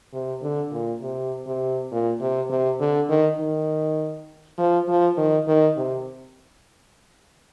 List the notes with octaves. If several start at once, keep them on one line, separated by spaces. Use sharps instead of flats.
C3
D3
A#2
C3
C3
A#2
C3
C3
D3
D#3
D#3
F3
F3
D#3
D#3
C3